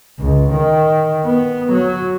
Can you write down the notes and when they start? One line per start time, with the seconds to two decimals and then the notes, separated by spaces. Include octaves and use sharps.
0.20 C#2
0.53 D#3
1.25 B3
1.73 F#3